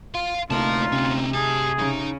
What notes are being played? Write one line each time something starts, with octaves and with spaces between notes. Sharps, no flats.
F5 C6
D2 C3 A3 A#3 D#4 F4 C#5 A5
C3 C4 C#4
G4 G#4 A5
C#3 D#4